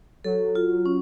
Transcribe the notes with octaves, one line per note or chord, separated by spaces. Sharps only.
F#3 A4
F4
C#4